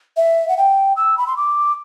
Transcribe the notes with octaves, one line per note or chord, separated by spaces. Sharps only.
E5
F#5
G5
E6
B5
C6
D6